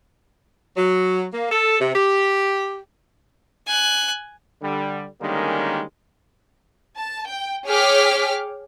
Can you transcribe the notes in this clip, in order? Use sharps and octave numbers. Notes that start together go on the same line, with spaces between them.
F#3
A#3
A4
C3
G4
G#5 F#6
D3 G3
D3 D#3 G3 G#3 A#3 C#4
A5
G5
G#4 C#5 G5 D6 F6 B6